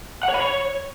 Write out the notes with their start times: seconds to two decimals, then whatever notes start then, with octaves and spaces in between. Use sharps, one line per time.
0.23 F#5
0.29 C#5
0.34 B5
0.40 C#5